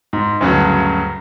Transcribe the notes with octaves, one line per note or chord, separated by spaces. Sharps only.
G#2
D2 G2 C#3 F#3